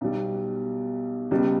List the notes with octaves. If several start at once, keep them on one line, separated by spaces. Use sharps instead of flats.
B1 B2 G3
C#2 B2 G3